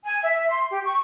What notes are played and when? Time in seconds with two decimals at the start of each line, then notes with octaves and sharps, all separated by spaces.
0.04 G#5
0.22 E5
0.48 C6
0.70 G4
0.85 C#6